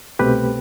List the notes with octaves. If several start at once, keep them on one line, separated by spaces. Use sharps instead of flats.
C2 B2 A3 C4 G4 B4